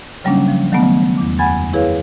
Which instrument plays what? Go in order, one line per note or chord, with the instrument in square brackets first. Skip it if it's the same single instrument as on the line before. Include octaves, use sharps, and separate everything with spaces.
[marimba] C#3 F#3 G3 A#3 C#4 D4
F3
D#3 F#3 G3 A3 B3
E2 D6
F#2 F#5 G#5 B5 G#6 A6
E4 G#4 B4 C#5 F5